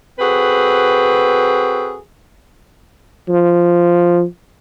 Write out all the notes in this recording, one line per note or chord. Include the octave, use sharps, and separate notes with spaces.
C4 F#4 G#4 A4 B4
F3